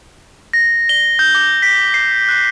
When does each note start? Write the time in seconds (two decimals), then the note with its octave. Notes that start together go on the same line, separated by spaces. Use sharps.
0.53 A#6
0.89 G7
1.19 G6
1.35 D6
1.62 B6
1.94 C7
2.29 F#6